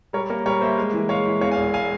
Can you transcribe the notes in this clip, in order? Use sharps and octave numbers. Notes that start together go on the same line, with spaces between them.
G3 A#4 C#5
A#3 A#4 C#5
G3 A#4 C#5
A#3 C5 E5
G#3
E3
G#3 C#5 F5
E3
E2 C#5 F5
F5 G#5
E1
F5 G#5